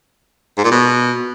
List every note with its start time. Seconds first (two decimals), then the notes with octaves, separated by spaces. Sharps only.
0.57 G#2
0.64 A#2
0.71 B2